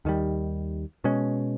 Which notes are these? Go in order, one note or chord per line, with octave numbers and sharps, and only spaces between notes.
D#2 D#3 G3
B2 G#3 C#4